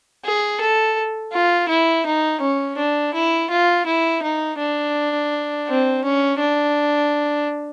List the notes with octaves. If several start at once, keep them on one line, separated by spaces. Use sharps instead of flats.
G#4
A4
F4
E4
D#4
C#4
D4
E4
F4
E4
D#4
D4
C4
C#4
D4